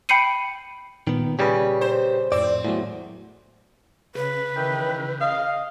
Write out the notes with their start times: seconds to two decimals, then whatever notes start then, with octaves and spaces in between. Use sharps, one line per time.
0.09 G5 B5 G6 C7 C#7 D#7
1.07 A#2 D#3 B3
1.39 C#3 G3 C#4 G4 B4
1.81 C5
2.32 F2 A2 C4 D5
2.64 G#1 E2 A2 F#3
4.15 C#3 B4
4.56 D#3 E3 G5
5.21 D#5 F5